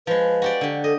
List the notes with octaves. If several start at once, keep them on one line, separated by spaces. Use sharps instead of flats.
F3 G#3 B4
F#4 G4 D5
D3 G4
A4 D#5